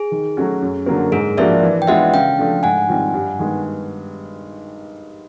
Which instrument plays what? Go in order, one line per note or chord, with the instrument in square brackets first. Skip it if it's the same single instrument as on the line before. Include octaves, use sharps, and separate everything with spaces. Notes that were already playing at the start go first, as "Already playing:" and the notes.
Already playing: [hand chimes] G#4
[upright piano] D#3
F#3 A3 C#4 F#4
F#2
D3 F#3 A#3
[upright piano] G#2 [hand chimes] G#4 A#4
[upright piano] F3 A#3 D4 F#4 [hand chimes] D5 E5
[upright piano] E3
[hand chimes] G5
[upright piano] G#3 B3 D4 F4 [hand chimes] E5 F#5
[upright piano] C#3 [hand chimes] F5 G5
[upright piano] F3 A3 D4
[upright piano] G#2 [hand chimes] F#5 G#5
[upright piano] D#3 G3 C4 F4
G2
D#3 G#3 B3